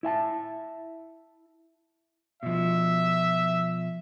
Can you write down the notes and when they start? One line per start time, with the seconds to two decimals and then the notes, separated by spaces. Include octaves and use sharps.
0.03 E4 E5 G#5 A5
2.43 B2 F3 E5